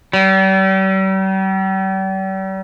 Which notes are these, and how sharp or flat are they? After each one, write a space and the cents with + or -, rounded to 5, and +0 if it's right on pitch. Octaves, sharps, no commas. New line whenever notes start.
G3 -40